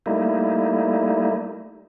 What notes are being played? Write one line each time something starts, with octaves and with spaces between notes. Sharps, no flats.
G3 A3 A#3 D#4 E4